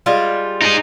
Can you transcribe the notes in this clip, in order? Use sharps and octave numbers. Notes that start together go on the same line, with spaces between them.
G3 G#3 F4
D#4 G#4